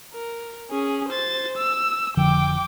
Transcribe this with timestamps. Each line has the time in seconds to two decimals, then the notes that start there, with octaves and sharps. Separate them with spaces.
0.14 A#4
0.71 C#4 G#4
1.09 C5 A6
1.57 E6
2.17 F1 D3 F3 G5 D6